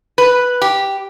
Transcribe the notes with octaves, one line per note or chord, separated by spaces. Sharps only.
B4
G4